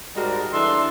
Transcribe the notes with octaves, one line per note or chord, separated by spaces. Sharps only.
G#2 G3 G#3 F#4 A#4 A5
E3 D4 A4 E5 C6